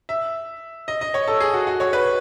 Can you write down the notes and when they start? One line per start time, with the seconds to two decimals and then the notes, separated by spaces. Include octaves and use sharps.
0.09 E5
0.88 D#5
1.01 D#5
1.14 C#5
1.28 A4
1.40 G#4
1.54 F#4
1.67 F#4
1.80 C#5
1.93 B4